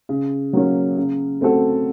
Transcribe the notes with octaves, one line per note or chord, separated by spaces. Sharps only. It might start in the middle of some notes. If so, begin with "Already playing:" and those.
C#3
F#3 A#3 C#4
C#3
A3 C4 F#4 A4